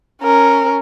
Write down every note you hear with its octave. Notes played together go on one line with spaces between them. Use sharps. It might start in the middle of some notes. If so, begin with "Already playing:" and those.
C#4 A#4